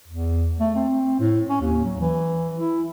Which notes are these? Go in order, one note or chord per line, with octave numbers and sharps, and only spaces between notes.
E2
A3
C4
A2
C#4
D#2
F#3
E3
E4